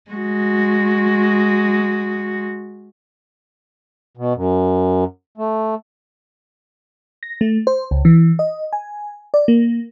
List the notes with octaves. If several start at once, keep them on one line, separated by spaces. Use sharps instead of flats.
G#3 F#4
B2
F#2
A3
A#6
A3
C5
C#2
E3
D#5
G#5
D5
A#3